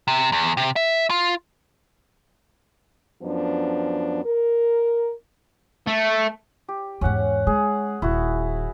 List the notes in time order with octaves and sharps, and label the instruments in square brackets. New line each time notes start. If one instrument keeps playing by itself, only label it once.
[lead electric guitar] C3
E2
C3
E5
F4
[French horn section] F#2 F3 B3 D4
A#4
[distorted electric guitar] A3
[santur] G4
[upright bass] E2 G#2 [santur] C#4 F#5
[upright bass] G#3 [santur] G#4
[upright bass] D#1 [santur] E4 F#4